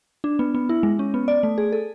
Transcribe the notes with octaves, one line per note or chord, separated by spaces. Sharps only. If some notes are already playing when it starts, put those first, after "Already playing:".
D4
B3
B3
E4
G#3
C#4
B3
D5
A3
G#4
A4